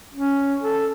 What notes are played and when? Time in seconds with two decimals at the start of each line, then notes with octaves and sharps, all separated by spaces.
0.13 C#4
0.63 A4